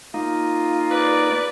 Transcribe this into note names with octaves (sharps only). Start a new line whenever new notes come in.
A#3 D#4 F4
B4 D5